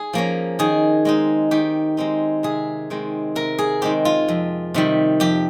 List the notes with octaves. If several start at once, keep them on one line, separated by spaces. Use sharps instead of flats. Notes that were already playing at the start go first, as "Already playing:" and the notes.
Already playing: G#4
F3 A#3 C#4
D#3 G#4
G#3 C4 D#4
D#3 G4
G#3 C4 D#4
C3 G#4
D#3 G#3 C4
C3 A#4
G#4
D#3 G#3 C4 G4
F4
F2
C3 D#3 G3
F2 G4